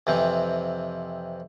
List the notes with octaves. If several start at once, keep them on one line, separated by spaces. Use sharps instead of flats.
F2 C3 E3 C4